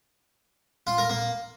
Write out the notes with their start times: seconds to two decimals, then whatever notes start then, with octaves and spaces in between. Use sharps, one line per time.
0.87 F4
0.98 A#4
1.10 A#3